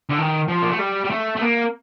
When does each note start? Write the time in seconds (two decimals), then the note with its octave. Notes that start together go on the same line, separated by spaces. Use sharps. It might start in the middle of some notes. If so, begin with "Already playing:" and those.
0.09 D3
0.19 D#3
0.49 F3
0.62 A#3
0.71 A3
0.79 G3
1.05 G3
1.11 A3
1.36 A3
1.42 A#3